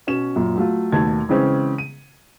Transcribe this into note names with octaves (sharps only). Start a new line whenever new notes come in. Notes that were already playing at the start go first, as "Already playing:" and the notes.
B2 C#4 E7
F#2 A#2
F#3 A3 F4
D#2 B2 A3 A5 G#6
C#3 E3 G#3 C4 C#4
D#7